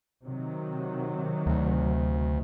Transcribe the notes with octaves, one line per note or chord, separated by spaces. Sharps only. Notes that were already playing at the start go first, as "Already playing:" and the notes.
C3 D#3 F#3
D2